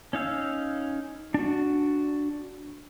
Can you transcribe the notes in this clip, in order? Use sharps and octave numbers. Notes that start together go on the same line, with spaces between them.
C#4 D#4 F5 E6
D4 F#4